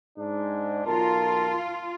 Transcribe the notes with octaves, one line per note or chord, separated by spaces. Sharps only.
G#2 D4
B1 F4 A#4 A5